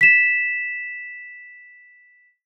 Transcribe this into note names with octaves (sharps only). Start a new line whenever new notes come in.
B6 E7